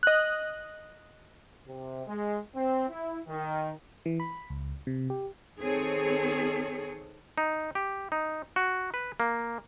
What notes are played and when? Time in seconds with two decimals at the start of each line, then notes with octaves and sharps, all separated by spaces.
0.03 D#5 F#6
1.67 C3
2.07 G#3
2.55 C4
2.89 E4
3.27 D#3
4.06 E3
4.20 B5
4.50 C#2
4.87 C3
5.10 G4
5.60 D#3 C4 G#4 A4 C#5
7.38 D#4
7.75 G4
8.12 D#4
8.56 F#4
8.94 B4
9.20 A#3